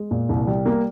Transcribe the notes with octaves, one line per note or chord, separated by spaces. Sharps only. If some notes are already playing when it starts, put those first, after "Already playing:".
Already playing: G#3
A#2
C2
G3
A#3